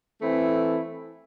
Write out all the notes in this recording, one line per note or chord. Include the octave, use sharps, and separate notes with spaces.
E3 A3 C4 E4